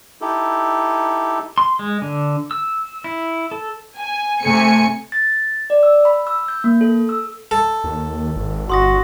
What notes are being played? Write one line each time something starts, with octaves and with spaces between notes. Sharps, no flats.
D#4 E4 G4 A4
C6
G#3
D3
E6
E4
A4
G#5
C3 A3 G#5 C#7
A6
D5
E6
B5
E6
G6
A#3
A4
E6
A4
D#2
G#1
G1 F#4 C6 D#6 A#6